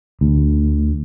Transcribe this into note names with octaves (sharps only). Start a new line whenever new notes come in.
D2